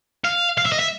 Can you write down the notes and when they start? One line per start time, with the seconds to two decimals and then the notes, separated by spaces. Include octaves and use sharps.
0.24 F5
0.58 F5
0.66 E5
0.72 D#5
0.79 E5